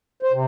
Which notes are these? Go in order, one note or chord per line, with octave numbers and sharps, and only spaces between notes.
C5
C3